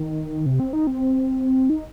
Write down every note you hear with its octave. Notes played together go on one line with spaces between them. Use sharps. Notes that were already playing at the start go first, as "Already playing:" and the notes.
Already playing: D#3
C3
C4
D#4
C4
D#4